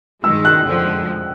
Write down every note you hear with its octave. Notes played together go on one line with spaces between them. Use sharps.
G2 D#3 G#3 E6
F#6
F2 D3 F3 G#3